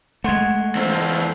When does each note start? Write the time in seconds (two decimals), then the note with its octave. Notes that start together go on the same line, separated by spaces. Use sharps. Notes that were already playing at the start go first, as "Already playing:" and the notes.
0.24 G#3 A3 F#5 C6 G#6
0.75 E2 C4